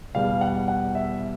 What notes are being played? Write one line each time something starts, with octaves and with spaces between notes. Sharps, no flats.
E2 B2 G3 F5
F#5
F#5
E5